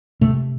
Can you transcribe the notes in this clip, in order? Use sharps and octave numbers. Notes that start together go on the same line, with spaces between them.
C3 A3